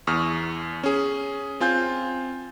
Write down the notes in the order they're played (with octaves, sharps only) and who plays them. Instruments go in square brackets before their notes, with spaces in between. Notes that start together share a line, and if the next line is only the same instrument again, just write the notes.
[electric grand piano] E2 C#6 D#6 F6
C#4 G#4
C4 F4 G#5 G6